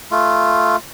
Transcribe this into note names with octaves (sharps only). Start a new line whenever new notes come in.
A3 F4